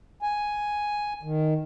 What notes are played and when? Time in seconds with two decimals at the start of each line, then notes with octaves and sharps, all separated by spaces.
0.22 G#5
1.23 D#3